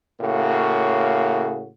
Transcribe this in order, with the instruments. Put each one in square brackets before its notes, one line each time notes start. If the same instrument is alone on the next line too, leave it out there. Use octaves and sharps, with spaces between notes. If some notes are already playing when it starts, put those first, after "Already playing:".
[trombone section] A2 C#3 A#3 F#4